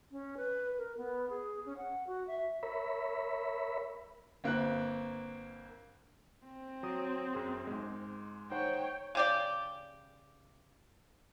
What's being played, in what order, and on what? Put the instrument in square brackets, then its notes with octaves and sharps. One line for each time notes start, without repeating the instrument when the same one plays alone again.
[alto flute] C#4
B4
A#4
B3
G#4
C#4
F#5
F#4
E5
[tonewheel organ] A#4 C#5 E5 B5
[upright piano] G1 A#3 C4 F#6
[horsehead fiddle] C4
[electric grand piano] F#3 D#6
F#2 G#4 C6
G#2 G#3
[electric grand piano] D#4 C5 F#5 [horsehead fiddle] C#5 G5
[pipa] C#3 G4 D5